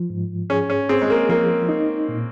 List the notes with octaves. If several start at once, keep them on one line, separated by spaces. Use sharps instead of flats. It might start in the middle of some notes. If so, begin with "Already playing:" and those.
Already playing: F3
G#2
C#4 G#4
C#4
C4 G#4
G#3
A#3
F3 A#3
D#4
A#2